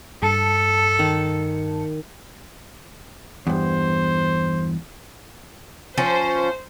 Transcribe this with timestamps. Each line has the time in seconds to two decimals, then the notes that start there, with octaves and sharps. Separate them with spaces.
0.23 G2 A4 A5 C#7
0.99 D#3
3.47 E2 G2 C5
5.98 F3 C#4 C5